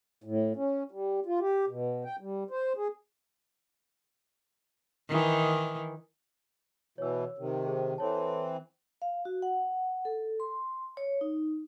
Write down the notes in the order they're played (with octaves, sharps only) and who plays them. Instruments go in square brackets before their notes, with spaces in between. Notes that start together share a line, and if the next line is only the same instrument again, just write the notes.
[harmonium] A2
C#4
G3
F4
G4
B2
G5
G3
C5
G#4
[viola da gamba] D#3 E3 D#4
[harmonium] B2 E3 [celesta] C#5 E6
[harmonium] C3 D#3
[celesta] G#4 C5
[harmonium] E3 C4 [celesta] A4 C#5 A5
[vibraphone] F5
F#4
F#5
A4
C6
C#5
D#4